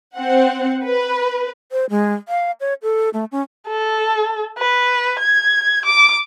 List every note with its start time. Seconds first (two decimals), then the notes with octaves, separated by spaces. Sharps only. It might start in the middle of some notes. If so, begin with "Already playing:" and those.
0.16 C4 F#5
0.84 B4
1.72 C5
1.90 G#3
2.28 F5
2.60 C#5
2.83 A4
3.14 A3
3.32 C#4
3.68 A4
4.58 B4
5.20 G#6
5.86 D6